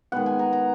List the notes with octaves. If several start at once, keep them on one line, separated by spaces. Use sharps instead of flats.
D#3 G#3 B3 F#5
G#5
A#5
A#5